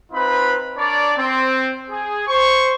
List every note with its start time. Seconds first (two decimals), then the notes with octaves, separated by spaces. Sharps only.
0.12 C4 D#4 F4 B4 B5
0.76 D4 A#4 C#5 D5
1.17 C4
1.89 G#4
2.28 C5 C#6